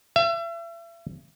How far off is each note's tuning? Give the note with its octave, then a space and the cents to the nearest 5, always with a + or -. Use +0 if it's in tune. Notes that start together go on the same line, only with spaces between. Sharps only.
E5 +35